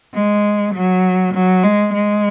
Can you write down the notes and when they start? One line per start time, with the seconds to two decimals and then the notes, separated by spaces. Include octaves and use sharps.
0.14 G#3
0.74 F#3
1.34 F#3
1.64 G#3
1.93 G#3